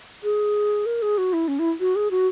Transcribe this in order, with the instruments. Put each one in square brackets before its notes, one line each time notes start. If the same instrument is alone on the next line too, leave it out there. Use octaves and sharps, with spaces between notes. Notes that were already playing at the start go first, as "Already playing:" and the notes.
[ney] G#4
A#4
G#4
F#4
E4
C#4
E4
F#4
G#4
F#4